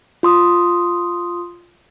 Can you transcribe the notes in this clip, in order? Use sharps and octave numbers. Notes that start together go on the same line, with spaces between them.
F4 C6 D#6